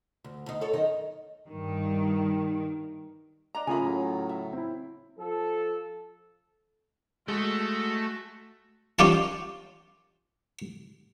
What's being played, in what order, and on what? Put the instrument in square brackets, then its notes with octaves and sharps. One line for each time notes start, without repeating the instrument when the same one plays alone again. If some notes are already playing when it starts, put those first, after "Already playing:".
[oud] D2
D2 D#4
A4 C#5
F#2 D#3 D#4
[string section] G2 D#3
[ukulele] D4 D#5 A#5
[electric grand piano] C#3 F4 A#5 [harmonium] A3 A#3 G#4 [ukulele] G#5 B5
[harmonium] A2 F#3
[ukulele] E5
[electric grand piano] C4 E4
[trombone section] F3 A4
[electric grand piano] G#3 [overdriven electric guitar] A3 [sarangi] F#4
[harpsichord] C#4 F4 G4 F5 A5